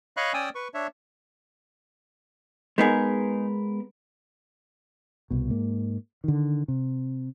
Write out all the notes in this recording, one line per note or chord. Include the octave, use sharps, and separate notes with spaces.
C#5 D#5 F5 B5 C#6 F#6
C#4 D5 G5 G#5 D#6 E6
B4 C#6
D4 C#5 E5
G#3 B3 D#4 G#4 A#4
C2 B2
G#2 A#3
D3 D#3
C3